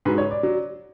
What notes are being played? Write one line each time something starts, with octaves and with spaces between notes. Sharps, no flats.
G#2 F#3 B4
C#5
D5
F#3